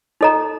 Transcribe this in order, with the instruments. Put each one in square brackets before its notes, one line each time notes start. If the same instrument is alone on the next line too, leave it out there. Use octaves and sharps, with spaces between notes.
[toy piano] D#4 A4 D#5 A#5